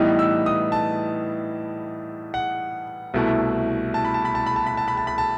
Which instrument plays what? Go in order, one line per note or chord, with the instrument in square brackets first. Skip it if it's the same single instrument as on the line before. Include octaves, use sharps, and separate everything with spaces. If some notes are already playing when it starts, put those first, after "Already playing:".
Already playing: [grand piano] A2 E3 G3 B3 D#4
E6
D#6
A5
F#5
C2 B2 A3 E4
A5
B5
A5
B5
A5
B5
A5
B5
A5
B5
A5
B5
A5